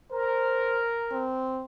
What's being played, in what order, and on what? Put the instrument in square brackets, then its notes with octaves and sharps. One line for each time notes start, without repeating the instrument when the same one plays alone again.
[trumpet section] A#4 [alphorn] C5
[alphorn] C4